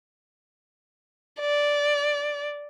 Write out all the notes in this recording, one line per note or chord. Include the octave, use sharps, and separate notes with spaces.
D5